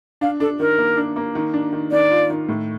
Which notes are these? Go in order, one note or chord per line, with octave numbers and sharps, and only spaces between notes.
D4 F5
D4 A4
D#3 A#4
A#3
D4
A#3
D#3
D4
D#3
D#3 D5
F4
D#3
A2